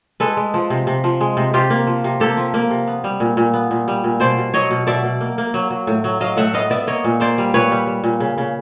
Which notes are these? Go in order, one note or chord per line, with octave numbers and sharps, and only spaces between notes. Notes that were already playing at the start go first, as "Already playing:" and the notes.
G#3 A4 B4
G#3
F3
C3
C3
F3
G#3
C3
C3 F4 G4
A#3
F3
C3
A#3 G4 A4
F3
A#3
C3
B3
G3
A#2
A#2
B3
A#2
G3
A#2
B2 C5 D5
B2
F#3 C#5 D#5
B2
B2 D5 E5
B2
A#3
A#3
F#3
F#3
A2
F#3
F#3 D#5 F5
A2 E5 F#5
B3 D#5 F5
B3 D5 E5
A#3 C#5 D#5
A#2
A#3 C5 D5
G3
A#2 B4 C#5
G3
G3
A#2
C#3
C#3